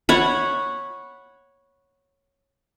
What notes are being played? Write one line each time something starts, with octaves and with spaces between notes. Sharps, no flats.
C#5 F#5 B5